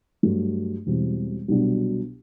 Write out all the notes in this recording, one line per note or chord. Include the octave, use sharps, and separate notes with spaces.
G2 F#3 A3
E1 E2 B2 G3 C4
C2 B2 F#3 B3 D4